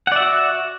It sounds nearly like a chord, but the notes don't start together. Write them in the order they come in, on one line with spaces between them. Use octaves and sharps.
F#5 D5 E5 F#4